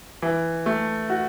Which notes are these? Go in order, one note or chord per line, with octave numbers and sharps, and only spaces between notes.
E3
A3
F#4